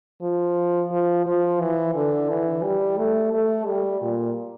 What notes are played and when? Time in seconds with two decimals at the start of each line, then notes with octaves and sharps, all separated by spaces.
0.22 F3
0.91 F3
1.26 F3
1.60 E3
1.95 D3
2.29 E3
2.63 G3
2.97 A3
3.33 A3
3.66 G3
4.02 A#2